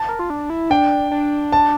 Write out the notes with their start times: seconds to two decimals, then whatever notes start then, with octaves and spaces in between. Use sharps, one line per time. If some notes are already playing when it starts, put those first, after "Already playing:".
Already playing: A5
0.08 A#4
0.19 F4
0.30 D4
0.50 E4
0.70 D4 G5
1.11 D4
1.52 A5